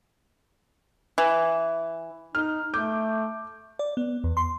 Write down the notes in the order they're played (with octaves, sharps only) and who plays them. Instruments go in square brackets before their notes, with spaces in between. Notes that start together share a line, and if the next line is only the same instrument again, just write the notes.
[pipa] E3
[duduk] D#4 [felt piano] F6
[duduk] A3 [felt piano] D6 G6
[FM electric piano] D5
B3
E2
C6